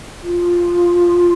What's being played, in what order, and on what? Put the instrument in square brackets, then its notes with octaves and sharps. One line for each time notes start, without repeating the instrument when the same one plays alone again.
[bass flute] F4